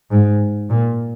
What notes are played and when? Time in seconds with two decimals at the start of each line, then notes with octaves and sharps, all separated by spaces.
0.11 G#2
0.70 A#2